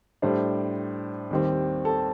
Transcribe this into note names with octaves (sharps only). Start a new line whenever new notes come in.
A2 G3 D4 C5
D#2 D#3 G3 C4
A4